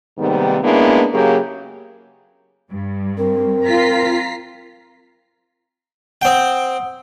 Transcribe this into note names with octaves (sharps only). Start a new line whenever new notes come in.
G#2 C3 D#3 G3 A#3 B3
G#3 A#3 B3 C#4 D4 E4
C#3 F#3 A#3 G4 G#4 C#5
G2
C4 A#4
F4 A#5 B6 C7
C4 F#5 G5 D#6